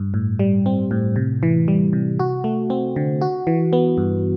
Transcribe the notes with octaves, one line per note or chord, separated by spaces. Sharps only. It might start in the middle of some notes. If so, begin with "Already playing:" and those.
Already playing: G2
A2
G3
C4
A2
C3
E3
G3
C3
F#4
A3
C4
D3
F#4
E3
B3
G2